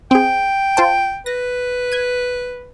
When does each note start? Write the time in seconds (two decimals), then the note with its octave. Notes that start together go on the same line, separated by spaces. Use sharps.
0.11 C4 G#4 G5
0.77 F4 C5 A5
1.26 B4 A#6
1.92 G#6 D#7